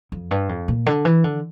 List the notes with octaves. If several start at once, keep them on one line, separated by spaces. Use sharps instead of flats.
F2
G2
F2
A#2
D3
E3
D3